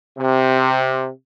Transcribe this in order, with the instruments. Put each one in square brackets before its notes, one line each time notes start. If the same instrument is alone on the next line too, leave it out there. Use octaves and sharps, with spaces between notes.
[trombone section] C3